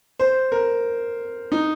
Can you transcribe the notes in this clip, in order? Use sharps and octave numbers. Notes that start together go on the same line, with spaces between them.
C5
A#4
D#4